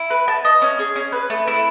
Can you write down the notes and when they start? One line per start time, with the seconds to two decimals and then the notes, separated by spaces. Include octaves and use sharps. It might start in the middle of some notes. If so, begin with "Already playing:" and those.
Already playing: E4
0.10 B4
0.28 A5
0.45 D#5
0.62 C#4
0.79 G#4
0.95 C#4
1.12 B4
1.30 A3
1.47 E4